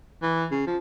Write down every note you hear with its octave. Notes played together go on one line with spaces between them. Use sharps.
E3
C#3
F3